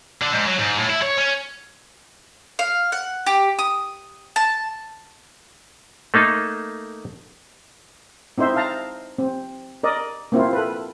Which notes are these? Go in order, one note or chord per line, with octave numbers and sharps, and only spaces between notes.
D3
G#2
F#3
G#2
A2
E4
C#5
C#4
F5
F#5
G4
D#6
A5
A3 A#3 D#4 A4
C4 D#4 E4 C5 E5
F5 A5 A#5
C4
A#4 D5 D#5
A#3 C4 E4 F4
A4 B4